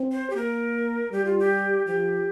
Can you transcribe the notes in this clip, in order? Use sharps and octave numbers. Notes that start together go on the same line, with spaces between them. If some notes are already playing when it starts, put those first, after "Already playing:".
Already playing: C4
C5
G4
A#3 A#4
G3 G4
F4
G4
F3 G4